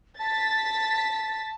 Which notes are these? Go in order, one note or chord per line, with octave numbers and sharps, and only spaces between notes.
A5 A6 B6